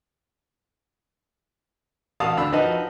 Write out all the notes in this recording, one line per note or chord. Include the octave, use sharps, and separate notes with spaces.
A1 F#4 F5 A5 D#6
D2 D4 B5 E6
F3 D#4 F#4 B4 D#5